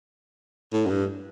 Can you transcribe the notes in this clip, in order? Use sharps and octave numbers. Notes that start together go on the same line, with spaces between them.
A2
F#2
G2